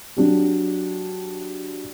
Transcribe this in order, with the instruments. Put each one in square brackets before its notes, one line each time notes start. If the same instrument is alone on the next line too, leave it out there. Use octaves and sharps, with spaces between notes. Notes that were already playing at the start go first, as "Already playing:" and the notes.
[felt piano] F#3 D4 G4